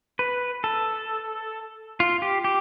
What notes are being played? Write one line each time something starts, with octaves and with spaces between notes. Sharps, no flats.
B4
A4
F4
G4
G4